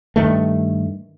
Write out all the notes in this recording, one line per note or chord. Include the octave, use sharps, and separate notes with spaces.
G2 D#3 A3